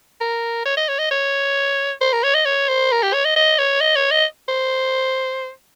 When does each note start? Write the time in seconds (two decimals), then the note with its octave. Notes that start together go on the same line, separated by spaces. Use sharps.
0.21 A#4
0.66 C#5
0.77 D#5
0.88 C#5
0.99 D#5
1.11 C#5
2.01 C5
2.13 A#4
2.24 C#5
2.34 D#5
2.45 C#5
2.69 C5
2.92 A#4
3.03 G4
3.13 C#5
3.25 D#5
3.36 D#5
3.59 C#5
3.81 D#5
3.96 C#5
4.11 D#5
4.49 C5